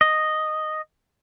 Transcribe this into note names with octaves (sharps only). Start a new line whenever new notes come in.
D#5